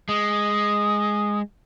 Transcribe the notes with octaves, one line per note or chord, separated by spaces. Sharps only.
G#3 D#6